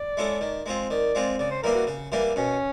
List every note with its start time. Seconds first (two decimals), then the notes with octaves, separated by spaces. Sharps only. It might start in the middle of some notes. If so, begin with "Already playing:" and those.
Already playing: D5
0.17 G#3 C#4 E4 A4
0.41 D#3
0.66 G#3 C4 F4
0.90 D#3 D5
1.15 G#3 C4 F4
1.39 C#3 D5
1.51 C5
1.63 E3 G3 A#3 D4 A#4
1.75 F#4
1.87 C#3
2.12 E3 G3 A#3 D4
2.36 B2 C#4